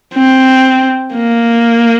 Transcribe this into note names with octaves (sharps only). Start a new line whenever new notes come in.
C4
A#3